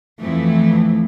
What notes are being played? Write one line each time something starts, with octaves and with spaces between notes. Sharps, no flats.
F2 E3 A3